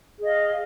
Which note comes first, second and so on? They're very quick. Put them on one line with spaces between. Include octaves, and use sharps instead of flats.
G#4 D#5 F5